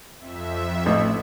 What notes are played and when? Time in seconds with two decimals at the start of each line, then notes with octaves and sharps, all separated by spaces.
0.20 F2 E5
0.86 A1